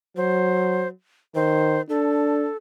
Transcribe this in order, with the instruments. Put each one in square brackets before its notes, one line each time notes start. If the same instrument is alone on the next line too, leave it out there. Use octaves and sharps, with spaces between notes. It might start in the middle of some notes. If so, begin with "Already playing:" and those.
[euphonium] F#3 [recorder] C5
[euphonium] D#3 [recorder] C5
[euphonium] D4 [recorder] A4